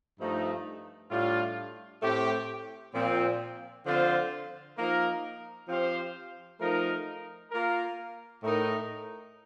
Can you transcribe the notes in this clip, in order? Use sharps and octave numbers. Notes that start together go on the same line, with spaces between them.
G2 F3 A3 D#4
A2 G3 D4 F4
A2 A3 C4 G4
A#2 F3 C4
D3 F3 C4 F4 C5
F3 A#3 D#4 A#4
F3 C4 G4 C5 F5
F3 A3 D#4 A#4
A#3 F4 A#4
A2 A3 D#4 A#4